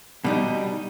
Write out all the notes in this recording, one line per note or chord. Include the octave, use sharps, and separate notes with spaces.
B2 G3 D#4